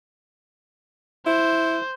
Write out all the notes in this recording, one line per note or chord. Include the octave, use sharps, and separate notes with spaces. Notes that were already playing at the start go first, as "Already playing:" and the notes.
E4 C5